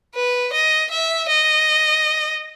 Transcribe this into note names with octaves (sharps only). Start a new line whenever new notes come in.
B4
D#5
E5
D#5